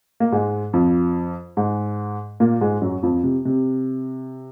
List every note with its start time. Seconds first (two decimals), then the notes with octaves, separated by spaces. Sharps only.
0.20 A#3
0.32 G#2 G#3
0.73 F2 F3
1.57 G#2 G#3
2.40 A#2 A#3
2.61 G#2 G#3
2.82 F#2 F#3
3.03 F2 F3
3.24 C3
3.45 C3